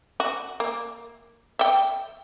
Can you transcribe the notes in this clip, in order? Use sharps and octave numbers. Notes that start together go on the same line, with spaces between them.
F#4
A#3
E5 G5